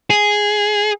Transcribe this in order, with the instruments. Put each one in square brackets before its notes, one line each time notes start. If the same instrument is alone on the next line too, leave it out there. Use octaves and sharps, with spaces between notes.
[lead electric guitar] G#4